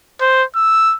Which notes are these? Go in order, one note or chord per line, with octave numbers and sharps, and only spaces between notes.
C5
E6